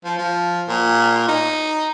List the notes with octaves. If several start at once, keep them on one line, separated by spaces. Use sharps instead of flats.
F3
F3
A#2
D#4